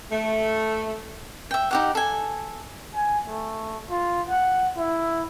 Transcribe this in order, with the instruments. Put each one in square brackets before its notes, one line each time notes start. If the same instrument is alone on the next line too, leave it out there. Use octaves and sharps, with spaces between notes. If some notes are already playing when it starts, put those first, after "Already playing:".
[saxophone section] A3
[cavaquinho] E5 G5
D#4 G4 F#5
A4 G#5
[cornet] G#5
A3
F4
F#5
E4